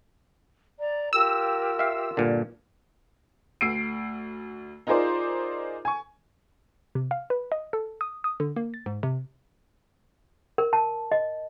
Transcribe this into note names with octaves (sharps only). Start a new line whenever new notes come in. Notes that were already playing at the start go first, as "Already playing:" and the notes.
D5 A#5
F4 G4 A#4 E6
E5 F5
G2 A#2 D3
D2 E6 C7 D7
D#4 F4 G#4 A#4 C5 D5
G#5 C#6
C3
F5
B4
D#5
A4
D#6
D#6
D3
A#3
A6
G#2
C3
A#4
A5
D#5